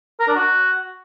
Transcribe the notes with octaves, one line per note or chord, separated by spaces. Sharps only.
A#4
D4
F#4